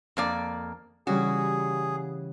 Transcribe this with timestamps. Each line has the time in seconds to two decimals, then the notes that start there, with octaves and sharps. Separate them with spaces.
0.17 F2 A#3 D5
1.07 C#3 E3 G3 F#4 G#4